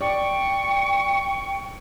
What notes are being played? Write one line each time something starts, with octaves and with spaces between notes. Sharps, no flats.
D5 G5 C#6